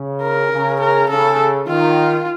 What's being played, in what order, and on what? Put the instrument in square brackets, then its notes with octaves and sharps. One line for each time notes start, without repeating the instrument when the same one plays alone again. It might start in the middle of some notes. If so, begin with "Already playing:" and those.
Already playing: [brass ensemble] C#3
[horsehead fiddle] A#4
[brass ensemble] C#3
[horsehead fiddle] A#4
[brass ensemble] C#3 [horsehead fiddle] A4
[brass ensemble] D#3 [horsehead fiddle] F4